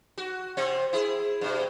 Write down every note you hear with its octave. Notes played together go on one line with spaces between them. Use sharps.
F#4
C3 C4
E4 G#4
G2 B2